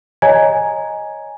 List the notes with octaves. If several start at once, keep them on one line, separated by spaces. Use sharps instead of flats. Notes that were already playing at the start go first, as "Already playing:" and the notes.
C#5 D#5 G#5 A#5 G#6